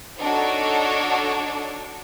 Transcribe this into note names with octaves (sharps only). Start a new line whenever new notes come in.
D4 D#4 F#4 A4 C#5